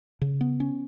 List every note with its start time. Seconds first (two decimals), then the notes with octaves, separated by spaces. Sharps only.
0.21 C#3
0.41 B3
0.60 C#4